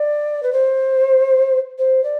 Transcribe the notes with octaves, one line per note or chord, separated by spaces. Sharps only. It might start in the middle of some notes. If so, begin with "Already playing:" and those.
Already playing: D5
B4
C5
C5
D5